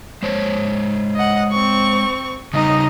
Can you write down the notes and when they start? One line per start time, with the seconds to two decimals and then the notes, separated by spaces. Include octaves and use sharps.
0.23 G#3 C5 C#5
1.15 D#5 F#5
1.52 C4 C#6
2.54 C#3 G3 D#4 D#5